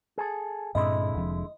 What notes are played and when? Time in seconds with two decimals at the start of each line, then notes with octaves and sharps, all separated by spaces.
0.18 G#4 A4
0.75 G2 A#2 D3 G#3 C4 E4 D#5
1.14 F1 F2